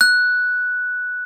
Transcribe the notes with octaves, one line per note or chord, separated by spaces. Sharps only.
F#6